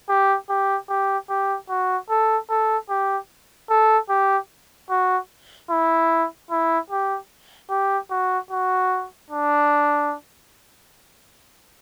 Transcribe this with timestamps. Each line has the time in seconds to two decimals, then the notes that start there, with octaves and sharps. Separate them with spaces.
0.09 G4
0.49 G4
0.90 G4
1.29 G4
1.69 F#4
2.10 A4
2.50 A4
2.89 G4
3.70 A4
4.09 G4
4.90 F#4
5.70 E4
6.51 E4
6.90 G4
7.70 G4
8.11 F#4
8.50 F#4
9.30 D4